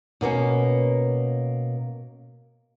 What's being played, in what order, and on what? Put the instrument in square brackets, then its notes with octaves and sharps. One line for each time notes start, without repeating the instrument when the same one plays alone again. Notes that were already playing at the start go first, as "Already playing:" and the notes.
[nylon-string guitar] B2 A#3 B3 C#4